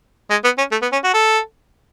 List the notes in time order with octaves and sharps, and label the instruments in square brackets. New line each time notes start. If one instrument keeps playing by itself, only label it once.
[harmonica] G#3
B3
C#4
A3
B3
C#4
F#4
A4